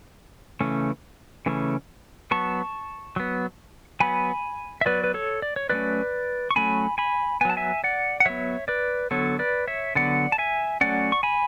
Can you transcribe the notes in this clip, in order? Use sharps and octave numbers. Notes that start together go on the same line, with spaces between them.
C#3 E3 A3 C#4
C#3 E3 A3 C#4
F#3 B3 A5 C#6
F#3 B3
F#3 B3 G#5 B5
E5
F#3 B3 B4 D5
B4
A4 C#5
D5
C#5
F#3 A3 C#4 B4 D5
C#6
F#3 A3 C#4 G#5 B5
G#5 B5
F#3 B3 G#5 A5
E5 G#5
D5 F#5
F#5
F#3 B3 C#5 E5
B4 D5
D3 F#3 B3 A4 C#5
B4 D5
C#5 E5
D3 F#3 B3 D5 F#5
A5
E5 G#5
F#3 A3 C#4 D5 F#5
C#6
G#5 B5